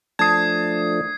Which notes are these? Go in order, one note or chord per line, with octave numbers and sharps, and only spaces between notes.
F3 A3 D4 A5 D#6 G#6 C7